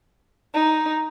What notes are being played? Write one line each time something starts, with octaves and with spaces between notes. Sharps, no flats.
D#4